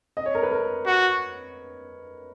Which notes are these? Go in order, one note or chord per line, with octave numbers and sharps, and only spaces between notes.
D#5
C#5
A#4
B4
A#4
F#4